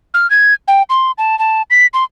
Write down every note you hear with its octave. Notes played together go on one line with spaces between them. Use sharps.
F6
G#6
G5
C6
A5
A5
B6
C6